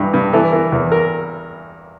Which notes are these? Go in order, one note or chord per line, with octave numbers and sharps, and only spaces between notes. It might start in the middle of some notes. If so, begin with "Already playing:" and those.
Already playing: G2 E3 G4
G2
E3 A4
E3 A#4
E2
A#4